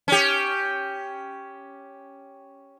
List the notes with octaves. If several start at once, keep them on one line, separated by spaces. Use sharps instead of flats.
C#4 G4